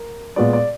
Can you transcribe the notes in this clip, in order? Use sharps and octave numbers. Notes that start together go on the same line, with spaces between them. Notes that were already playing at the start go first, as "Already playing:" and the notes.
Already playing: A#4
A#2 G#3 B3 D5
D5